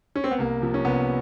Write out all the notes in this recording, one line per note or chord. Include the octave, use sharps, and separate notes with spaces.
C#4
C4
B3
C2 A#3
C3 F3
C#4
C2 B3